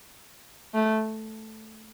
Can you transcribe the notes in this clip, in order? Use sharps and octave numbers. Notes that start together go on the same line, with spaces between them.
A3